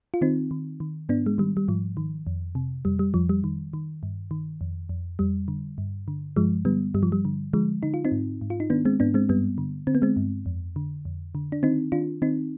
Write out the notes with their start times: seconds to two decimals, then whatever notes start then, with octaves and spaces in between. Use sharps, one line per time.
0.14 F4
0.21 D#3 C4 D#4
0.51 D#3
0.80 D#3
1.09 G#2 B3 D4
1.26 G#3
1.38 D#3 G3
1.57 G3
1.68 G#2 F3
1.97 D#3
2.27 F2
2.55 C3
2.85 F2 G3
2.99 G3
3.14 F2 F3
3.29 G3
3.44 D#3
3.73 D#3
4.03 G2
4.31 D#3
4.61 F2
4.89 F2
5.19 F2 G3
5.48 D3
5.78 G2
6.08 D3
6.36 G2 F3 G#3
6.65 D3 G3 B3
6.94 G2 G3
7.03 F3
7.12 G3
7.25 D3
7.53 D3 F3 G#3
7.83 D3 D#4
7.94 F4
8.05 C4 D#4
8.12 G#2
8.41 G#2
8.50 F4
8.60 D#4
8.70 D#3 B3 D4
8.85 G#3 C4
9.00 G#2 B3 D4
9.14 G#3 C4
9.29 G2 G3 B3
9.58 D3
9.87 D3 C4
9.95 B3
10.02 G#3 C4
10.17 G2
10.46 F2
10.76 D3
11.05 F2
11.35 D3
11.52 D4
11.63 D#3 C4 D#4
11.92 D#3 D4 F4
12.22 D#3 C4 D#4